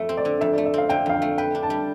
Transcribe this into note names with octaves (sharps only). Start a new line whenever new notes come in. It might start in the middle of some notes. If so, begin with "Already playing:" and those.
Already playing: F2 A3 E5
C4
D5
D3
F2 E5
D5
A3
E5
C4 F5
D3 G5
F2 F5
G5
A3
B4 G5
D4
A5
G3